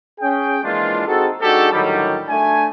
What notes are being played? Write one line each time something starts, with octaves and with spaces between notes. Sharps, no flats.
C#4 G#4 G5
E3 F3 G#3 A#3 D4 F4
C4 D#4 F#4 G#4 A4
G#3 D4 D#4 F#4 G4 A4
A2 D3 D#3 F#3 G3
A3 D4 G#5